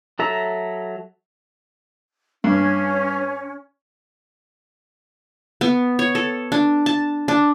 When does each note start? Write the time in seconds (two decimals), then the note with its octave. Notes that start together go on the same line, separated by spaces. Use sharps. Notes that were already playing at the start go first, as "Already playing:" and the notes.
0.19 F#3 A4 E5 A#5
2.44 G2 C#4
5.61 B3
5.99 C#5
6.15 A4
6.52 D4
6.86 A5
7.28 D4